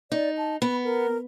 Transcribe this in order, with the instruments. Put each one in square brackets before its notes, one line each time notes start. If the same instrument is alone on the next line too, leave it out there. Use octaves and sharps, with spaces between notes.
[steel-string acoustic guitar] D#4 [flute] D5
[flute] A5
[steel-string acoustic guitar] B3 [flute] B5
[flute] A#4